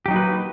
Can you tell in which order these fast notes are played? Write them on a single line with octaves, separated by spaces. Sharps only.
G4 F#3 D#4 A#3 B4